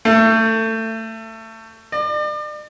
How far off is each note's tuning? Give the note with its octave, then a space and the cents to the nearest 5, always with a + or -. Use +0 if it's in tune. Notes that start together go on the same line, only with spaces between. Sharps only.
A3 +25
D5 +40